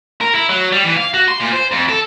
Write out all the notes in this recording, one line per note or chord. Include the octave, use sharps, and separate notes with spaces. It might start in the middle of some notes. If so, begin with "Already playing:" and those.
A#4
E4
F#3
G3
E3
F5
F#4
C6
A#2
C5
F2
A4